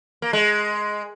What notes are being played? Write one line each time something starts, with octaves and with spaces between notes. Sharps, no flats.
A#3
G#3